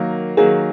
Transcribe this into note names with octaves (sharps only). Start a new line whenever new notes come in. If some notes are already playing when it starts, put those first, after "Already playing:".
Already playing: D#3 F#3 A#3
D#3 F#3 A#3 G#4